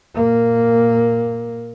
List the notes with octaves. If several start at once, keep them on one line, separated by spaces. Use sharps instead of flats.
A#2 A#3